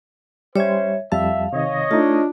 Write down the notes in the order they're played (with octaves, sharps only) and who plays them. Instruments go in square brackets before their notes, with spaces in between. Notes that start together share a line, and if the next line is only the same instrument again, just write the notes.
[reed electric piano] G3 G#6 [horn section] C#4 C5 [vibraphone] C#5 E5
[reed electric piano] F2 G3 A5 [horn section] E5 [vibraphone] F5
[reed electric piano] C3 D#3 [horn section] C#5 D#5
[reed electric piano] A3 D#4 [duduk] D4 [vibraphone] F4